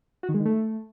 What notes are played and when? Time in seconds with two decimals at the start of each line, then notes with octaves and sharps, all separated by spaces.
0.23 F#4
0.29 D#3
0.34 G#3
0.40 D#3
0.45 A3